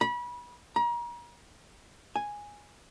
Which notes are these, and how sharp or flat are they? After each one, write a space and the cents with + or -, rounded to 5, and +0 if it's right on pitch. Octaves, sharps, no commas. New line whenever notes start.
B5 -30
A#5 +35
G#5 -5